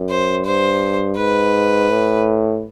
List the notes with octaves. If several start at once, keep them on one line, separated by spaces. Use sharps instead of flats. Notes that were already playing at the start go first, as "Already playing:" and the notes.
Already playing: F#2
C5
G2 C5
G#2 B4
A2